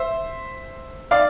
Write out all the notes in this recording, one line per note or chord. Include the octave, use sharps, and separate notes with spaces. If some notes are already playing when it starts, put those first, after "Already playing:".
Already playing: C5 E5
D5 F5